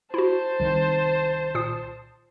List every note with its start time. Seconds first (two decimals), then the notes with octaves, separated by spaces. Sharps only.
0.14 E4 F#4 C5 A5
0.60 C2 D#3
1.55 A#2 D#6 C7